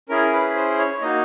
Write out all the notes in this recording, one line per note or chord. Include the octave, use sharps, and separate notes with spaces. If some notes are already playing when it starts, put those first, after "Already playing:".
C#4 E4 G#4 A#4
B4
C5
C#5
A#3 D#4 F#4 D#5